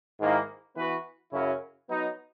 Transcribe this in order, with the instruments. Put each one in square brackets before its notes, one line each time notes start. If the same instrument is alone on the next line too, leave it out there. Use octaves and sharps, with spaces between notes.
[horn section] G#2 D#3 A#3 E4
E3 B3 F#4 B4
F#2 C#3 F#3 C#4 E4
F#3 B3 D#4